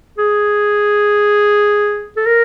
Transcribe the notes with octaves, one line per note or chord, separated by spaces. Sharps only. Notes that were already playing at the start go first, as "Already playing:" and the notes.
G#4
A4
A#4